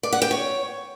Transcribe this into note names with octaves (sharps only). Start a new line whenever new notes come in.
D5
F#5
G5
C#5